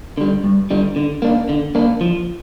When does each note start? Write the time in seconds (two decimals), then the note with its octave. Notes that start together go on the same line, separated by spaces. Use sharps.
0.18 D3 G3
0.44 G2
0.71 D3 G3
0.96 D3
1.22 A#3 D4
1.49 D3
1.75 A#3 D4
2.01 F3